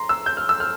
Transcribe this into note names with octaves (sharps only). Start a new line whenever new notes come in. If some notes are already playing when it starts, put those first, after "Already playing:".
Already playing: A#5 C6
E6
G6
F6
E6
F6